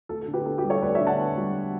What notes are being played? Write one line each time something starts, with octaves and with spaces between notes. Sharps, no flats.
D2 A4
A4
D3
G4 B4
B3 A4
G4 B4
G3
A4 C#5
D2 B4 D5
C#5 E5
D3
F#5 A5
B3
G3